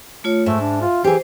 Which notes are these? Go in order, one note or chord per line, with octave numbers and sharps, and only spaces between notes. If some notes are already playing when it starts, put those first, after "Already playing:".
A3 F4 C#5
G#2 A3 E5
D4
F4
E3 G4 G#4 C5